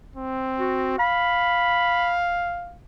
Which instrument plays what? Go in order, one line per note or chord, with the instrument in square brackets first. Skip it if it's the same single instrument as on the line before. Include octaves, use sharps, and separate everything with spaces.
[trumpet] C4
[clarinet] F#4
[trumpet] F5 [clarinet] B5